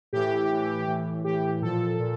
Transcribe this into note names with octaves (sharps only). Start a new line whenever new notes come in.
A2 E3 G4
A2 E3
A2 E3
A2 E3 G4
A#2 F3 A4
A#2